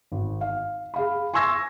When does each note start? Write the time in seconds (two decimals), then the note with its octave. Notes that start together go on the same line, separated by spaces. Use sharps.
0.12 G#1
0.41 F5
0.94 G#4 F5 B5
1.34 G#5 C6 C#6 E6 G#6 A#6